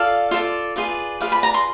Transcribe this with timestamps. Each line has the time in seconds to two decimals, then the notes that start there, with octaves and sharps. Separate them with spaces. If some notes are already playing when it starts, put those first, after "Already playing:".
Already playing: F4 A4 D5 F5
0.31 F4 A4 D5
0.76 F4 G#4 B4 D5
1.20 F4 G#4 B4 D5 F5
1.32 B5
1.43 A#5
1.54 C6